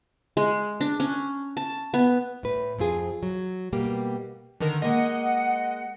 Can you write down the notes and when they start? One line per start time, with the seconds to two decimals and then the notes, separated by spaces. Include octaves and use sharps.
0.37 G#3
0.81 D4
1.00 C#4
1.57 A5
1.94 B3
2.43 A2 B4
2.78 F2 C4 F4 G#4
3.23 F#3
3.72 B2 G3 A#3 G4
4.60 D3 D#3 A#4
4.82 G#3 A#3 D#5 F#5